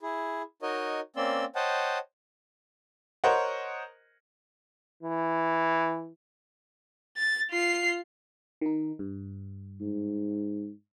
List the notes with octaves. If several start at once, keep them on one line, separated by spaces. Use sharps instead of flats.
E4 G#4
D#4 F#4 A#4 C#5 D#5
A#3 C4 C#4 D5 C6 E6
C5 C#5 D#5 F#5 G5 A5
A#4 C5 C#5 D#5 F#5
E3
A6
F4 C7
D#3 D#4
G2
G#2